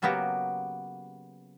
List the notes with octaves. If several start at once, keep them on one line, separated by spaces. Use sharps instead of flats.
C#3 F#3 A#3 B3 F#4 G4